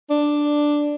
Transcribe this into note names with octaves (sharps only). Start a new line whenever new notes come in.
D4